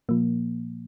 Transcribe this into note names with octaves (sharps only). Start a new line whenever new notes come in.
A#2 F3 A#3